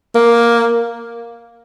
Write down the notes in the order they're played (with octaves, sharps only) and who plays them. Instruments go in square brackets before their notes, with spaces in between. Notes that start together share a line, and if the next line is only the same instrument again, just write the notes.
[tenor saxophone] A#3